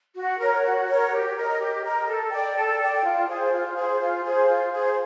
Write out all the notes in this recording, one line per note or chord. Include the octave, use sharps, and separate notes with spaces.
F#4
A#4 C#5
F#4
A#4 C#5
G4
A#4 D#5
G4
A#4 D#5
A4
D5 G5
A4
D5 G5
F4
G#4 C5
F4
G#4 C5
F4
G#4 C5
F4
G#4 C5